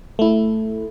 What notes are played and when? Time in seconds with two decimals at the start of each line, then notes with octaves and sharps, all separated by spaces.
0.19 A3 E4